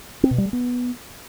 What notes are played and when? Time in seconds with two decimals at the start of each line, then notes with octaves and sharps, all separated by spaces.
0.23 C4
0.31 B2
0.38 G3
0.46 G#3
0.53 B3